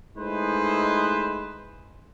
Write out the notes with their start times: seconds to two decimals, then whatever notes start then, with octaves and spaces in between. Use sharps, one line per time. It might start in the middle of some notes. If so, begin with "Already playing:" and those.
0.16 G#3 A3 D#4 E4 B4 C5